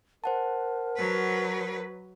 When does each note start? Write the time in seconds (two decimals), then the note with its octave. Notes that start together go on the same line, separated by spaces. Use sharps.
0.24 A#4 C5 F#5 A5
0.96 F#3 B4